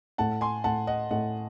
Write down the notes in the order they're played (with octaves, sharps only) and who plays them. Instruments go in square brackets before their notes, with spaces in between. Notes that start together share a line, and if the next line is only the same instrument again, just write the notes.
[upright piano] A2 [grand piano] F#5 A5
[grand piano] G#5 C6
[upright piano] A2 [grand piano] F#5 A5
[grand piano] D#5 F#5
[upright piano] A2 [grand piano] D#5 F#5